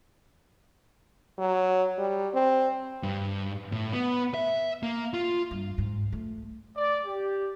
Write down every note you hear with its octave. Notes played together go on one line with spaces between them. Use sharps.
F#3
G3
C4
G2
A2
B3
E5
A#3
F4
G2
G#2
A3
D5
G4